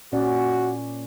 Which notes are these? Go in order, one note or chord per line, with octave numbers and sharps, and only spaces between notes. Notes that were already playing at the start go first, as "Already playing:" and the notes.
A#2 C#4 F#4 D5